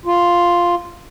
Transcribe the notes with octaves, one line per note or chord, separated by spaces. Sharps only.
F4